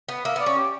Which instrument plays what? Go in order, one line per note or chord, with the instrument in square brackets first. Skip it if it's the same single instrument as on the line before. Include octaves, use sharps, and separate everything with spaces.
[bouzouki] B3
[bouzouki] A#3 [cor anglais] E5
[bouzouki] B3 [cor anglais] D5
[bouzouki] C#4
[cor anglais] G4